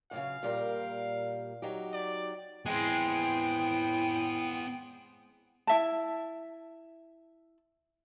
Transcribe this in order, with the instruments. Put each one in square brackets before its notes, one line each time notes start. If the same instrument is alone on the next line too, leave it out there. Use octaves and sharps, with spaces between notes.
[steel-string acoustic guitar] F#2 A#2 C#3 [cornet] F5
[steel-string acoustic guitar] A#2 G3 A#4
F#3 D#4 G4
[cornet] D5
[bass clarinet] A2 [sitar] G#3 C4 [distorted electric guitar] B3 G#4 [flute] G5
[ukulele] E4 E5 A5